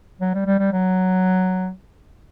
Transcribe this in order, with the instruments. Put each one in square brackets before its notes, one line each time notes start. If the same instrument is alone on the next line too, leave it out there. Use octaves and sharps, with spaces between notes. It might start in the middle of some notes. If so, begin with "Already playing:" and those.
[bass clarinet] F#3
G3
G3
G3
F#3